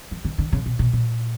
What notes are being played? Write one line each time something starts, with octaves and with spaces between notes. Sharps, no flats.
E3
D3
D3
C#3
B2
B2
A#2